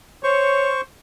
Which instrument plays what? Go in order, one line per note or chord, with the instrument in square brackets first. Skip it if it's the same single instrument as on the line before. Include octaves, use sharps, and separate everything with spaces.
[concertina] C5 C#6 [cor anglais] C#5